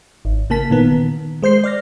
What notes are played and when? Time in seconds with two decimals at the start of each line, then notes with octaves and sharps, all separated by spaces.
0.25 G#1
0.50 C#3 A#3 A5 B6
0.70 A#2 D#3 B3
0.92 D#3
1.42 G#3 C5 G6 C7
1.64 D5 F6 A#6